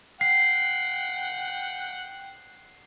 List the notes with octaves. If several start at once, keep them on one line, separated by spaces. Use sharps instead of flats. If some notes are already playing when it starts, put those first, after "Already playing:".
F#5 G5 C7